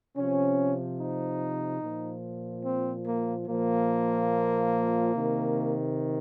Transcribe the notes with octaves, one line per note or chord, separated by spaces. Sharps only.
C3 F3 C#4
D#4
A#2 F3
C4
A#3
A#2 F3 A#3
C3 D#3